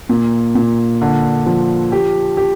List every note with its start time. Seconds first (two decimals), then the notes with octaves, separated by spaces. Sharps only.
0.09 A#2
0.55 A#2
1.02 D3
1.46 F3
1.92 G4
2.37 G4